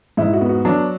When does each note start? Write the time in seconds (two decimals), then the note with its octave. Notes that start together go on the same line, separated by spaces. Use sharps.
0.17 G#2 E4
0.33 F#4
0.41 B3
0.49 F#4
0.65 F#3 D4